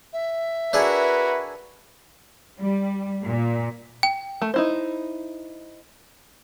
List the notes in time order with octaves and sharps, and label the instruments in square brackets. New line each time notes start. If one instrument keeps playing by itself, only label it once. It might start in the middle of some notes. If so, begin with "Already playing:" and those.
[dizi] E5
[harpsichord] D4 E4 G#4 [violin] F#4 A#4 [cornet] B4
[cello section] G3
A#2
[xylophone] G5
[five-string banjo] A3
D#4 E4 C5